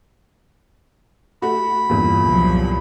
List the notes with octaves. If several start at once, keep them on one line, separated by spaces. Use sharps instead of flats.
A3 F#4 B5
E2 G2 A#2
C2 F3 F#3